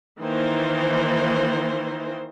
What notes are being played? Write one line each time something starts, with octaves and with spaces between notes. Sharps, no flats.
D#3 E3 A#3 C5